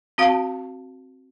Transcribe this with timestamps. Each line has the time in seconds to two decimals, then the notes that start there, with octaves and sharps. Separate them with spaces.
0.18 C4 F#4 F5 A5